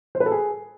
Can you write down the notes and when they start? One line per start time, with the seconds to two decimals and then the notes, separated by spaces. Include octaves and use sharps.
0.15 C5
0.20 B4
0.26 A4
0.31 G#4